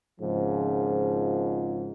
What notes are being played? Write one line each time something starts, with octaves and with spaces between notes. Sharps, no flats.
G#1 G#2 C#3 F3